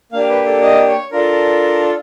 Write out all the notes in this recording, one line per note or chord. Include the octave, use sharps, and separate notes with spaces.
A#3 D4 G4 F5
B4
A4
D#5
C#5
D4 F4 A4 A#4